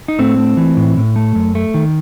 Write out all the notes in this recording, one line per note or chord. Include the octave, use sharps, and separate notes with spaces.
D#4
A2 A3 C4
A3
E3
A2
A2
A3
F#2
A3
D#3